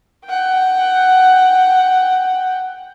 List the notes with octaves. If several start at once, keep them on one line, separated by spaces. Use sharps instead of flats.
F#5 G5